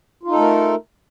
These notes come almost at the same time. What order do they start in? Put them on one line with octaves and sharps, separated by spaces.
F4 D#4 A4 A3 A#4